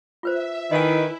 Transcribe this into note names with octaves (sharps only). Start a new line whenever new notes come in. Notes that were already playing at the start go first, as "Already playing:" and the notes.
F4 B4 C5 E5
D#3 E4 B4 D#5 G#5